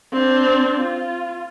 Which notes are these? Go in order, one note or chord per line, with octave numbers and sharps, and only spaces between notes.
C4 D4
F4